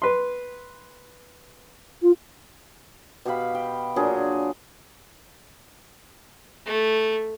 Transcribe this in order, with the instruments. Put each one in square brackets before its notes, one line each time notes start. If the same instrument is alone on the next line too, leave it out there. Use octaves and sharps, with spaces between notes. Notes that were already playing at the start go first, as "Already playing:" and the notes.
[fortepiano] B4 C6
[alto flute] F4
[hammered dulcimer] B2 G4 F5 B5
G5
A#2 F#3 D4 G#4
[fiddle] A3